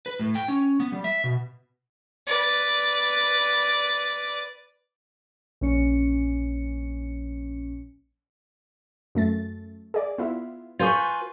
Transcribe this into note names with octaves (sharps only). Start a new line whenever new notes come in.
B4
A2
G5
C#4
B3
G3
E5
B2
B4 D5
A#1 C#4 C#7
F#2 A3 A6
G#4 D5
B3 E4 F4
F4 B4 G#5 C#6 G6